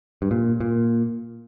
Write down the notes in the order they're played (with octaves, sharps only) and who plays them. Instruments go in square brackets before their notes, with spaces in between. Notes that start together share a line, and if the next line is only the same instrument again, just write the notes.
[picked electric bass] G2
A#2
A#2